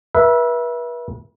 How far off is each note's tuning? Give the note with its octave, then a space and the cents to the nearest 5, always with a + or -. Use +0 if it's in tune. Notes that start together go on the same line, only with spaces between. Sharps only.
B4 -35 E5 +0